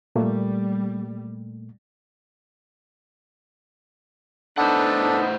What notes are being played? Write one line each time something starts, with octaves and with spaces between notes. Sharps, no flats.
A#2 G3 A3 A#3
A2 B3 D4 D#4 A4 B4 C5 F#5